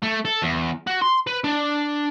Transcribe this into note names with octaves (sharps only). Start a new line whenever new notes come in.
A3
A4
E2
F#4
C6
B4
D4